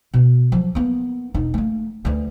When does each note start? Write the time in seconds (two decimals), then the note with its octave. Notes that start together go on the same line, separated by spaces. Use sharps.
0.14 B2
0.52 F3 F#3
0.75 A#3 B3
1.34 E1 D#4
1.54 A3 A#3
2.05 D2 E3